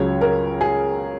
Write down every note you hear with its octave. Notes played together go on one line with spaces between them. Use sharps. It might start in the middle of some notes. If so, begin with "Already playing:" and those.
Already playing: C#2 C#3 F#3 C#5
A#4
G#4